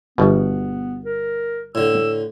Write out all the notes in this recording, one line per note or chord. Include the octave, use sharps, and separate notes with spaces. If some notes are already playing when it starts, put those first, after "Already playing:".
G1 B2 B3
A#4
A2 D3 E6